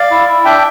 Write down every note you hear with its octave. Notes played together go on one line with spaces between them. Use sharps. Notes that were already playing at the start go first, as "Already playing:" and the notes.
Already playing: D5 F5
E4
E4
D4 E5 G5